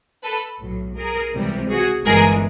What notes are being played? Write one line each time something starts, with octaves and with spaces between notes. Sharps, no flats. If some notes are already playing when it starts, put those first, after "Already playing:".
A4 B4
B1 A2 F#3
G#4 A#4
C#2 C3 E3 G3
F#4 G#4
G1 G2 E3 G#3 G#4 A#4